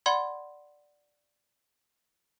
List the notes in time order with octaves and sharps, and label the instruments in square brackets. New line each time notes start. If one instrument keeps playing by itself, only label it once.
[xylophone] D5 F#5 B5 C6 G#6